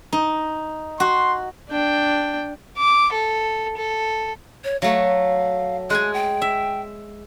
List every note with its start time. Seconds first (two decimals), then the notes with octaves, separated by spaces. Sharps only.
0.13 D#4
1.00 F#4 C6
1.69 D4 G5
2.78 D6
3.13 A4
3.77 A4
4.64 C#5
4.82 F#3 A3 F5
5.90 G#3 G#5 F#6
6.14 G5
6.42 E5